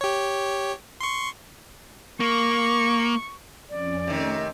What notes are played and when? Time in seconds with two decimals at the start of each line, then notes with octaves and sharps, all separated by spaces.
0.01 G4 C#5
1.01 C6 C#6
2.20 A#3 C#6
3.69 F2 C#4 D5
4.07 C3 D#3 A3 C#4 A#4